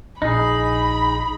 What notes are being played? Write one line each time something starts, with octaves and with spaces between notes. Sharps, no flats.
A#1 D#4 G#4 B5